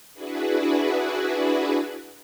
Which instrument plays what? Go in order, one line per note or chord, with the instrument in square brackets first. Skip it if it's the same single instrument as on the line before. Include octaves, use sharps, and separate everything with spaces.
[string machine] D4 E4 F#4 G#4 B4